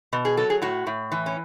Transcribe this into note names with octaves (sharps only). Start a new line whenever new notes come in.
B2
G#4
F#3 A4
G#4
A2 F#4
A2
E3
C#4